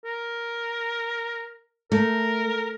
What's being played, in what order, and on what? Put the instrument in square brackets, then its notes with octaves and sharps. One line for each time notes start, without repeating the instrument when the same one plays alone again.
[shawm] A#4
[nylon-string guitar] A3 [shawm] A#4